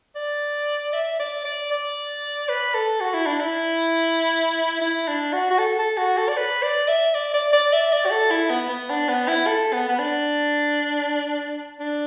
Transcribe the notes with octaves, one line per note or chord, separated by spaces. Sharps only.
D5
E5
D5
D5
D5
B4
A4
F#4
E4
D4
E4
E4
D4
F#4
F#4
A4
A4
F#4
A4
D5
B4
D5
E5
D5
D5
D5
E5
D5
F#4
A4
E4
B3
B3
D4
B3
E4
A4
B3
B3
D4
D4